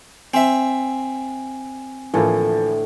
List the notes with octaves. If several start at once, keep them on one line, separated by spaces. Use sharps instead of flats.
C4 E5 G#5
D2 A2 E3 F3 A#3